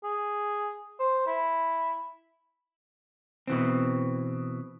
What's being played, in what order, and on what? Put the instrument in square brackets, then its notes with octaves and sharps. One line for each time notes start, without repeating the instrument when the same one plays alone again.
[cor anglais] G#4
C5
E4
[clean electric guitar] B2 E3 C4